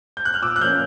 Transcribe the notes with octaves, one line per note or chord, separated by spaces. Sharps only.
G6
F#6
F6
A#2 D6 E6
F#6
F3 A#3 C#4 F6 G6